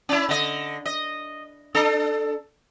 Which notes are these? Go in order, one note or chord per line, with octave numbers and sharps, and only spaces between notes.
C#4 E4
D3 D#5
D#5
D4 A4